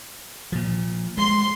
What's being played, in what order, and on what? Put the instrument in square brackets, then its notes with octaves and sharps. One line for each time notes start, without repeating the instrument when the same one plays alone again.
[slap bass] A#2 F3
[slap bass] G#3 [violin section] C6